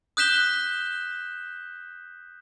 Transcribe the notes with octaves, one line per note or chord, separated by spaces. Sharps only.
D#6 F#6 G6 B6 E7 G7